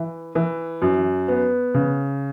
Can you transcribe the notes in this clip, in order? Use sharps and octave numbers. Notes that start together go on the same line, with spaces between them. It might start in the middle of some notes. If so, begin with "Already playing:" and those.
Already playing: E3
E3
F#2
B3
C#3